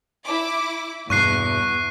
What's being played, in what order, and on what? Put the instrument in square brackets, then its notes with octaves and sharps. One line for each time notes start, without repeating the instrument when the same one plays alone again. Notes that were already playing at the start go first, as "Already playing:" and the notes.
[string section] E4 D6
[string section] E2 [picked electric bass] G2 B2 [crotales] C#6 F#6 C7